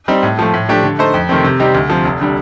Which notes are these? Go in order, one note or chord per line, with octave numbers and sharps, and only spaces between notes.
G3 C4 D#4
A2
F3 A3
A2
F3 A3 D4 G4
D3
A3 D#4 A4 C5
F2
C3 D#3 A3 C4
C3
G3 C4 D#4 G4
D2
C3 F3
F1
D3 G3